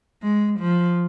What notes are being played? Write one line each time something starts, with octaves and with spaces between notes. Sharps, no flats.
G#3
F3